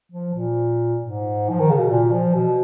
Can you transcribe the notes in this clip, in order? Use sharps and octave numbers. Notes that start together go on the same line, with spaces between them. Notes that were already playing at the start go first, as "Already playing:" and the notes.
F3
A#2
G#2
F3
D#3
C#3
B2
A#2
F3
B2